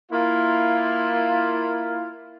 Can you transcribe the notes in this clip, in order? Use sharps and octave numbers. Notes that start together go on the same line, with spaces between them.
A#3 E4 F4